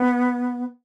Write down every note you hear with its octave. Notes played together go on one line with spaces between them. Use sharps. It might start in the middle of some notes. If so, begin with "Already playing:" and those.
Already playing: B3